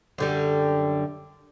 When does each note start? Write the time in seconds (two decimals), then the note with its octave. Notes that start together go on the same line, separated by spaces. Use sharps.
0.18 F#2 D3 G3